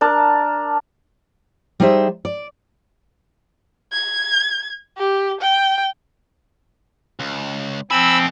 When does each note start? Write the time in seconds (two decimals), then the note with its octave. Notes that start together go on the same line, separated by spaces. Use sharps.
0.01 D4 A#4 A5
1.80 G3 D#4 G#4 C5 E5
2.25 D5
3.92 G#6
4.98 G4
5.41 G5
7.20 C#2
7.91 F2 F3 C4 G#5 B5 E6